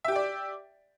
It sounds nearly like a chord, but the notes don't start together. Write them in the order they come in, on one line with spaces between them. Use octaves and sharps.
E5 G4 G5 D5